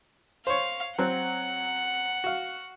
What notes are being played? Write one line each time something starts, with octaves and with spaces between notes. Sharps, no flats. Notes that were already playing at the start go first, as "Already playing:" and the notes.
C5 C#5 F5
F#3 C4 F#5 F#6
F#4 F5